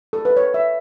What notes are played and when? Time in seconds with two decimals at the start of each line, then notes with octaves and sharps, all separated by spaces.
0.13 A4
0.25 B4
0.37 C#5
0.54 E5